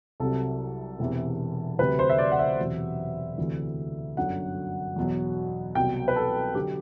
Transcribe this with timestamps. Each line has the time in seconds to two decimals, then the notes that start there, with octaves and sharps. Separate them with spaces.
0.20 C2 C3 F#3 A4
0.99 E1 E2 C3 E3
1.79 D2 C3 F#3 B4
1.99 C5
2.10 E5
2.18 D5
2.32 F#5
2.39 E5
2.59 E1 E2 C3 F#3
3.38 D2 C3 E3
4.17 G1 F#2 D3 F#3 F#5
4.96 E2 B2 F#3
5.75 C2 B2 F#3 G5
6.08 B4
6.16 A4
6.55 D3 F#3 G4